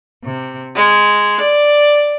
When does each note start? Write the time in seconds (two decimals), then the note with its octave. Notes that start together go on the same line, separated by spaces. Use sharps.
0.24 C3
0.74 G#3
1.40 D5